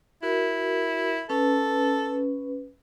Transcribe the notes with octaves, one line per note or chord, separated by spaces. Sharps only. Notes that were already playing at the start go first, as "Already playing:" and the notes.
E4 F#4 A#4
C#4 A4 B4